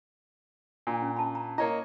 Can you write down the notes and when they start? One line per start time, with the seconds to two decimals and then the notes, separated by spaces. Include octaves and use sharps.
0.87 A#2 D4 G#5
1.02 C#4
1.16 A5 B5
1.35 A#5
1.58 A#3 E4 C#5 D#5 A#5